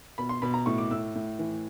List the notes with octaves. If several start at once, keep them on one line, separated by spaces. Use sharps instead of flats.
B2 B5
C6
B2 B5
A#5
A2 C#6
D6
A2 E6
A2
E3